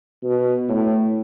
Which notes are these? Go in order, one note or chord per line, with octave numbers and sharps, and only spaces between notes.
B2
A2